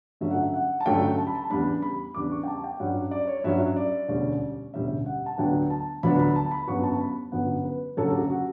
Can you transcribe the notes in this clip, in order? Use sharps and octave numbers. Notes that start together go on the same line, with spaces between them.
G2 D3 F#3 A3 C#4 E5
F#5
E5
F#5
A5
G2 D3 F#3 A3 C#4 G5
A5
B5
A5
E2 C#3 G3 D4 B5
B5
E2 C#3 G3 D4 D6
C#6
G5
A5
G5
G2 F#3 C#4 F#5
D5
C#5
G2 F#3 C#4 E5
D5
E1 D2 D3 G3 C#4
E1 D2 D3 G3 C#4 E5
F#5
A5
D2 D3 F#3 B3 D4 G5
A5
D2 D3 F#3 B3 D4 B5
B5
A5
B5
G1 F#2 D3 F#3 B3 C#6
A5
B5
G1 F#2 D3 F#3 B3 F#5
B4
F#1 F#2 D3 F#3 C#4 A4
F#4
G4
F#4